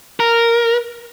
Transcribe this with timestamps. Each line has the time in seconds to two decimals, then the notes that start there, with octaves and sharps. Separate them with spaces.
0.20 A#4